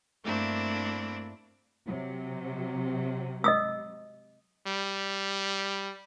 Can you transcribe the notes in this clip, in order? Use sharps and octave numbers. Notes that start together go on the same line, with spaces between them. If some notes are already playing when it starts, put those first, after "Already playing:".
G2 A3 A#3 C4 D4 E4
C3 F#3
D#5 D#6 E6
G3